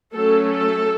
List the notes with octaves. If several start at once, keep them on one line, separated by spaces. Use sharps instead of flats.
F#3 A3 C#4 A4
A4